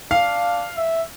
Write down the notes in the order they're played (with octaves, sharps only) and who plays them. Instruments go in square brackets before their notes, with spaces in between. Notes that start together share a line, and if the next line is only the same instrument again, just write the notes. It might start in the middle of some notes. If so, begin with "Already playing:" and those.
[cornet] D4 [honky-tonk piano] F5
[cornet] E5